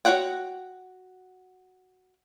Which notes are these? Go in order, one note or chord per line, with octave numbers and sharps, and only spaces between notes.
F#4 C5 C#5 F#5 G5